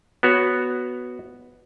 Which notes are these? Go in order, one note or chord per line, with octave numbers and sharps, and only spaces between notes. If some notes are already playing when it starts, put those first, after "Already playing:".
B3 F#4 C#5